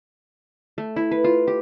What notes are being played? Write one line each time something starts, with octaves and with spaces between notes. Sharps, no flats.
A3
E4
B4
F4
G4